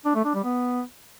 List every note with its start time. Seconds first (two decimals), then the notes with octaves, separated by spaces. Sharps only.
0.05 D4
0.15 A3
0.25 D4
0.34 G3
0.44 B3